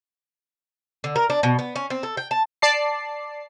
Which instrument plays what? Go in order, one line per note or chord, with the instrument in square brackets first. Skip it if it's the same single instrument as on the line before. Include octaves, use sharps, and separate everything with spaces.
[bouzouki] D3
A#4
D4
B2
B3
C#4
C4
A4
G5
A5
[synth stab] D5 A5 C7